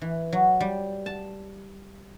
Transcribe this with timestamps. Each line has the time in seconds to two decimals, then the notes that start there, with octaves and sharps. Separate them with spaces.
0.02 E3
0.33 F#3
0.60 G3
1.06 A5